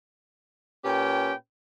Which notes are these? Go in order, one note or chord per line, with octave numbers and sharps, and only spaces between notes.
A#2 C#4 G4 B4 G5